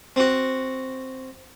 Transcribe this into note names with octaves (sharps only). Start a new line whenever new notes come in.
C4 F#4